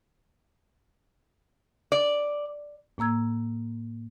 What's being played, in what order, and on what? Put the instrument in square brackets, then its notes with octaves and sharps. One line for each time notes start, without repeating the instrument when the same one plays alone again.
[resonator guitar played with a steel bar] D5
[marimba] A2 A#3 A#5 E6 G#6